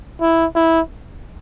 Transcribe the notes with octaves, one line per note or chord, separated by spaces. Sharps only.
E4
E4